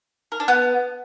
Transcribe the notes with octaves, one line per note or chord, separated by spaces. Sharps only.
A#4
D4
B3